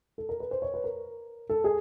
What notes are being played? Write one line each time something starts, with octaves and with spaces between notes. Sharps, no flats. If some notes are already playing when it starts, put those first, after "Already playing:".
A4
A#4
B4
C5
C#5
B4
A#4
A4
G#4